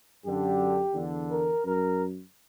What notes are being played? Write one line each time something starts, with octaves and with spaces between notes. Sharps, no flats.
F#2 D3 G4
E2 D3
A#4
F#2 A#4